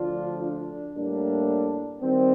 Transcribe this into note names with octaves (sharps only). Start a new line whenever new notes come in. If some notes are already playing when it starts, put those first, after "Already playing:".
Already playing: D2 D3 F3 D4 F4
D4
A2 G3 A#3 D4
D#3 G3 C4